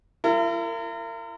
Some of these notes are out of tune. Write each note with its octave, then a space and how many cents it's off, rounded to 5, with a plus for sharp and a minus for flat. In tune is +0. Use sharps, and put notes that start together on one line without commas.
E4 +45 A#4 -30